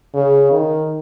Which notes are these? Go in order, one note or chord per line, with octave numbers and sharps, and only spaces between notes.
C#3
D#3